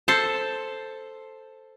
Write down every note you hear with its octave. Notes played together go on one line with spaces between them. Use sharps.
A4 C5 A5